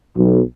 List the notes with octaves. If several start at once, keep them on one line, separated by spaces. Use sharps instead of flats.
B1